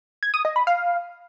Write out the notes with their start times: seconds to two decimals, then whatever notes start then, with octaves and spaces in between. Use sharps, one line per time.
0.23 G#6
0.34 D#6
0.45 D#5
0.56 B5
0.67 F5